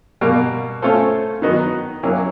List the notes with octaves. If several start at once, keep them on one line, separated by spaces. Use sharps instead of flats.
B2 G3 A#3
A3 C#4 F4 A4 C5
D#3 F#3 B3 D#4 F#4
F#3 A#3 C#4 E4 G4